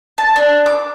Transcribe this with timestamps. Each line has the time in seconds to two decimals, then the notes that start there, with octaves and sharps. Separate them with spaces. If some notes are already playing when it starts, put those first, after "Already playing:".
0.18 A5
0.36 D4
0.66 D6